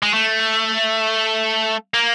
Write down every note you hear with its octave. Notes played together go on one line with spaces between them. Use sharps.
G#3
A3
A#3